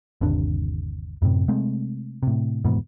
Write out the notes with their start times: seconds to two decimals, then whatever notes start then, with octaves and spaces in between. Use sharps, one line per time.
0.21 G1 D#2 C3 D4
1.22 F#2 A2 C3
1.48 C3 G#3 A3 C4
2.23 A2 C3
2.64 F1 E2 G#2 B2